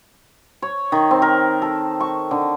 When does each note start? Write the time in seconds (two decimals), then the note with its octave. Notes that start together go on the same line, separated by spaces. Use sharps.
0.62 C#5
0.92 D#3
1.11 C4
1.22 A#4
1.62 A4
2.00 C#6
2.31 D3